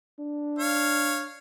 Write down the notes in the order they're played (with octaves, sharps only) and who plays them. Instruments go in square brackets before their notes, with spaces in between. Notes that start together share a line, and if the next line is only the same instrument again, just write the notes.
[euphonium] D4
[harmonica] C#5 F5